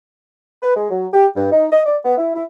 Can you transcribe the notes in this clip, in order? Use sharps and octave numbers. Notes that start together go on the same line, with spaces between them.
B4
G#3
F#3
G4
G2
D#4
D#5
D5
B3
E4
E4